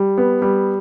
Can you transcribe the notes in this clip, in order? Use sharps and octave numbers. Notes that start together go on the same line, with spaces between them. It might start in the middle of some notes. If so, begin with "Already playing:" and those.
Already playing: G3
B3
G3